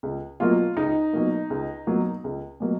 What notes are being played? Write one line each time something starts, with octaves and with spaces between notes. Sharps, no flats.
C#2
B2 F#3 A#3 F4
C#2 D#4
B2 F#3 A#3
C#2
B2 F#3 A#3
C#2
B2 F#3 A#3